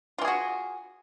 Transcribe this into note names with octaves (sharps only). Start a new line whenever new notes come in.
E3 F4 F#4 G#4